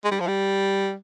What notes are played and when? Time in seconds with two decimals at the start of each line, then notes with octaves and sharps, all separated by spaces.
0.05 G#3
0.11 G3
0.20 F3
0.28 G3